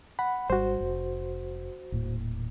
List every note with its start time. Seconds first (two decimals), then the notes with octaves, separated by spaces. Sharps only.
0.19 F#5 B5
0.50 G#1 G3 F#4 C5
0.81 F1
1.92 D#1 A2 A#3